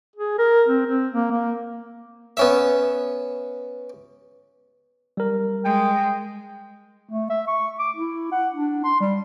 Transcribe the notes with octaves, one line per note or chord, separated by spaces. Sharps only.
G#4
A#4
C4
C4
A#3
A#3
B3 C#4 E5
G3 A#4
G#3 G5
A3
E5
C#6
D6
E4
F#5
D4
C6
G3